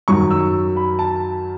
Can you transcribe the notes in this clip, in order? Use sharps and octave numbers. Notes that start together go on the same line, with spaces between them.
F#2 D#3 F#3 C#6
E6
B5
A5